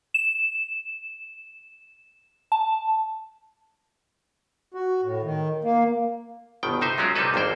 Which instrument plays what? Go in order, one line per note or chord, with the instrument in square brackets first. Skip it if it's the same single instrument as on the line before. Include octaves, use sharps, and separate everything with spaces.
[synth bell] E7
A5
[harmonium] F#4
A2
D#3
A#3
[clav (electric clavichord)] G1 B2 D#3 G5
C3 D#4 C5 E5
F#3 G#3 C#4 F4 F#4 A#4
C3 G3 C4 D#4 A4 B4
G#1 F2 A#3 C5 G5